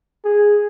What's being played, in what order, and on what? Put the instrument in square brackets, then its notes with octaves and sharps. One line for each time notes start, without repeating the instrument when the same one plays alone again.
[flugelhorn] G#4